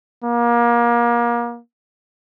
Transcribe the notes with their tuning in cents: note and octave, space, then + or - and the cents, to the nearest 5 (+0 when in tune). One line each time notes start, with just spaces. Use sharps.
A#3 +30